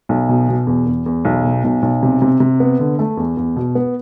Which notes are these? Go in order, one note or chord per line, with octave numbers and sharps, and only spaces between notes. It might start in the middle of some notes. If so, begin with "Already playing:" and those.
B1
B2
B2
E2
E2
E2
B1
B2
B1
B1
C3
C3
C3
B3
D3
A3
E2
E2
B2
B3